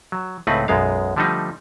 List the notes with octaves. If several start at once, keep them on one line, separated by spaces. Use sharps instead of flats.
F#3
C#2 A2 A3 C4 D#4 B4
B1 F#2 G#3 B3 F5
D3 F3 G3 A3 D#4